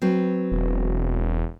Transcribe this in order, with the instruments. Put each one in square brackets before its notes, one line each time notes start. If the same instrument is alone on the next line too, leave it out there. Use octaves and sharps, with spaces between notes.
[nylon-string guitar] F#3 C4 B4
[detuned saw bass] E1